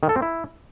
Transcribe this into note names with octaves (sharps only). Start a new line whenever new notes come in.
D#3
A4
C4
E4